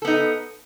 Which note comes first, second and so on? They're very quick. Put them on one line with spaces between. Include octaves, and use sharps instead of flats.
A4 B3 D#4